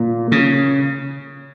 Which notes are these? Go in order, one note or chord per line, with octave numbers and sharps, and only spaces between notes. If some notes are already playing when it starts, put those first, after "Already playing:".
Already playing: A#2
C#3